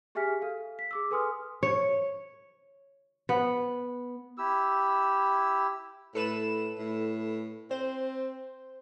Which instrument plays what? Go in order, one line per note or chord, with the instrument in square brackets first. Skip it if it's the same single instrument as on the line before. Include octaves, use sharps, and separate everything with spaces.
[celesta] G4 G#4 E5 G#5 F6 B6
A4 F5
B6
G#4 D6 E6
A4 B4 G#5 C6 D#6 F6
[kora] C#5
B3
[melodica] E4 G4 E6
[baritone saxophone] A2 [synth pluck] A4 B4 E7
[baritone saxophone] A2
[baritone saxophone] C4 [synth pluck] C5